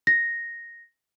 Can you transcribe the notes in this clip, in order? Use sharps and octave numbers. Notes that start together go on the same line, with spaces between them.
A#6